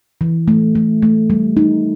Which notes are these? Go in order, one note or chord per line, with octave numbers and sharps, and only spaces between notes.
E3
A3
A3
A3
G3
D#4